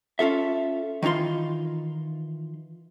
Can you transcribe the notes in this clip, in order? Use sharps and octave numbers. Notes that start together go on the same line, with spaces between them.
C#4 F4 A4 E5
D#3 E3 D#4 F4 C6